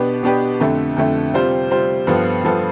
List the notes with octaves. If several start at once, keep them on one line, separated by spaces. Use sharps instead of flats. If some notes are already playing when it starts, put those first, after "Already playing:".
Already playing: B2 B3 D4 G4 B4
B2 B3 D4 G4 B4
F2 D3 A3
F2 D3 A3
C3 G3 C4 F4 C5
C3 G3 C4 F4 C5
G2 F3 B3 F4 A4
G2 F3 B3 F4 A4